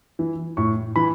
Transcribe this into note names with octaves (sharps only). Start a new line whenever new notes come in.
E3
A2 C#6
E3 B5